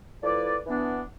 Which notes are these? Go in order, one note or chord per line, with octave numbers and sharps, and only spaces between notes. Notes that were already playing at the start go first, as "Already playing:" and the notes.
F3 A3 E4 B4 D5
E3 B3 D4